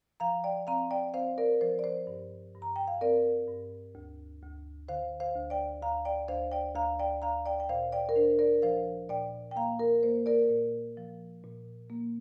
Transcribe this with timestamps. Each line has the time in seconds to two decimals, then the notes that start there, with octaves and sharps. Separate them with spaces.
0.20 F3 F5 A#5
0.44 D5 G5
0.67 C4 F5 A#5
0.91 D5 G5
1.14 C4 C5 F5
1.38 A#4 D5
1.61 F3 C5
1.79 D5
1.84 C5
2.07 G2
2.55 G2
2.62 A#5
2.76 G5
2.88 F5
3.01 C4 A#4 D5
3.48 G2
3.95 D2
4.42 D2
4.89 D3 C5 F5
5.20 C5 F5
5.35 D2
5.50 D5 G5
5.82 D2 F5 A#5
6.05 D5 G5
6.28 D2 C5 F5
6.52 D5 G5
6.75 D2 F5 A#5
6.99 D5 G5
7.22 D2 F5 A#5
7.46 D5 G5
7.60 G5
7.69 A#2 C5 F5
7.92 D5 G5
8.09 A#4
8.16 D4 C5
8.39 A#4 D5
8.62 F3 C5 F5
9.09 A#2 D5 G5
9.51 G5
9.56 A#3 F5 A#5
9.79 A#4
10.03 A#3 C5
10.26 A#4 D5
10.50 A#2
10.97 F3
11.43 A#2
11.90 A#3